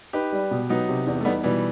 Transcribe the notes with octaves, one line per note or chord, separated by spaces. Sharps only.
D#4 G4 B4
G3
B2
F#3 B3 D#4
C3
E2
A3
G3 B3 D#4
B2 E3 G3